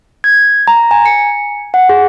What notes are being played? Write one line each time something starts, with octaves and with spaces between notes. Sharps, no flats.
G#6
A#5
G#5
C#7
F#5
G#4